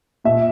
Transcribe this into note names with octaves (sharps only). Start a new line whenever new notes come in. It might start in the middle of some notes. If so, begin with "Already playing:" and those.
A#2 E5